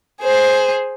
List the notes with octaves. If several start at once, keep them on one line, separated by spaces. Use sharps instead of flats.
G#4 C5